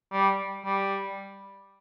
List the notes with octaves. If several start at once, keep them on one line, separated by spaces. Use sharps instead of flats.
G3
G3